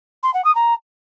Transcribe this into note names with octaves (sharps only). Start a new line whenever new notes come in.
C6
F#5
D#6
A#5